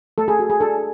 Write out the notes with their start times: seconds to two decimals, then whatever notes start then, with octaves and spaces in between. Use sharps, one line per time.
0.18 A3 A4
0.28 G#4
0.39 F#4 A4
0.50 G#4
0.61 D4 A4